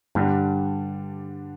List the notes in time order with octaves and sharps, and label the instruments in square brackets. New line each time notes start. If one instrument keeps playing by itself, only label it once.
[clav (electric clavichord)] G2 [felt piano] D3 G3 D4